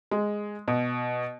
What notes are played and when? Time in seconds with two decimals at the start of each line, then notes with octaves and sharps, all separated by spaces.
0.11 G#3
0.68 B2